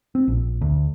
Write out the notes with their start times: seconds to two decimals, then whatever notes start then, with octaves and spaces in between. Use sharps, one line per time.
0.15 C4
0.28 A#1
0.61 D2